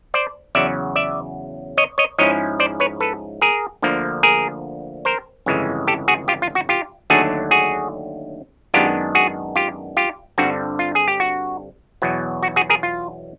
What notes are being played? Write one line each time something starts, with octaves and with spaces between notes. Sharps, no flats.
C5 D5
E2 C#3 F#3 D5 E5
D5 E5
C#5 D#5
C#5 D#5
G#2 F3 G#3 C#4 E4 C#5 D#5
C5 D5
B4 C#5
A4 B4
G#4 A#4
D2 D3 F3 A#3
G#4 A#4
A#4 C5
G1 F2 C#3 E3 G#3
G4 A4
F#4 G#4
F4 G4
F4
F#4
F4 G4
D#2 D3 F#3 A3 D4 F#4 G#4
F#4 G#4
F#2 D#3 G#3 B3 D4 F4 G4
F#4 G#4
F4 G4
F4 G4
G2 D3 G3 C4 F4 F#4
F4
G#4
G4
F#4
E2 B2 F#3
F#4
F#4 G#4
G#4 A#4
F4